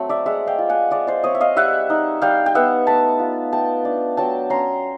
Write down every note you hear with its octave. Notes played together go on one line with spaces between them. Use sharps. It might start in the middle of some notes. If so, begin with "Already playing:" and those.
Already playing: F#3 A3 C4
D5 E5
G#3 E5 F#5
F5 G5
F4
F#5 G#5
G#3 D5 E5
C5 D5
C4 C#5 D#5
E5
D#5 F5
G3 E5 F#5
D#4
G3 F5 G5
G5
B3 E5 F#5
A3 A5 B5
F4
A3 G5 A5
D4
F#3 G5 A5
C#4 A#5 C6